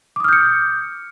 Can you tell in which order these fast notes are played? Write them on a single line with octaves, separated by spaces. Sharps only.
D6 D#6 F6 G6 C#7